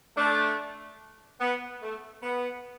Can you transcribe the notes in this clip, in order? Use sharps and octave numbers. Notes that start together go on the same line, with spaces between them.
A3 D4
B3
A3
B3